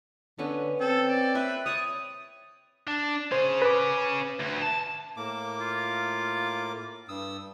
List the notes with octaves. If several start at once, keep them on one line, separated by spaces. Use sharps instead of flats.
D3 B3 C#4 B4
C4 A4
D5
B4 C5 E5 G5
C#5 D5 C#6 D#6
D4
C#4 G#4 C5
B4 D6
D2
A5
A2 A#3 D6
F4
G2 D#6 E6